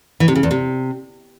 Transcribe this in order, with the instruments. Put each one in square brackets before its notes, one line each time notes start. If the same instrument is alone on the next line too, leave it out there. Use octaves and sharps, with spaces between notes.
[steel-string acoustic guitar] E3
C3
C#3
E2
C3